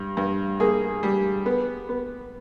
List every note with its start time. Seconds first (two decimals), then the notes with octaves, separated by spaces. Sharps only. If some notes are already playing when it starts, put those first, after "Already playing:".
Already playing: G2
0.17 G2
0.60 A#3 G#4
1.03 G3
1.46 B3
1.89 B3